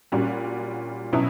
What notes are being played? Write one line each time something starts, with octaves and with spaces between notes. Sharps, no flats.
A#2 G3 C#4 F#4
B2 F#3 C#4 E4